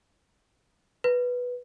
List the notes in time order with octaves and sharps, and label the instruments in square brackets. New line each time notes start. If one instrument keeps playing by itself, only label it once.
[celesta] B4